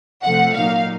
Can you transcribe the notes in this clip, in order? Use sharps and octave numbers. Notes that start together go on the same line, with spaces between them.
C3 F3 A3 F#5
A#2 F#3 A#3 D#4 F5